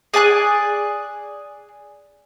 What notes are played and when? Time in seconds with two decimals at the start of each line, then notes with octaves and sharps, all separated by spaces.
0.14 G#4 D5 G#5 F#6